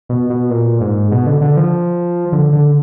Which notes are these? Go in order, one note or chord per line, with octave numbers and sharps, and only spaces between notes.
B2
B2
A#2
G#2
B2
D3
D3
F3
D3
D3